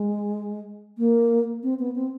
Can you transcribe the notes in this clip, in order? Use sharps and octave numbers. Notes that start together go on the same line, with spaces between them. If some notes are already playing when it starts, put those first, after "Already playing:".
Already playing: G#3
A#3
C4
B3
C4